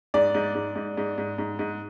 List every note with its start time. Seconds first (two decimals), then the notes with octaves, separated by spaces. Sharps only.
0.14 G#2 D5
0.35 G#2
0.55 G#2
0.76 G#2
0.97 G#2
1.18 G#2
1.38 G#2
1.59 G#2